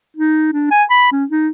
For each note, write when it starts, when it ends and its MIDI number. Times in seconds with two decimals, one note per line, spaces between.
0.17 0.50 63
0.53 0.67 62
0.71 0.84 80
0.90 1.11 83
1.12 1.25 61
1.30 1.49 63